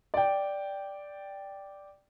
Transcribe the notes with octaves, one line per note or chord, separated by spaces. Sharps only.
D5 G5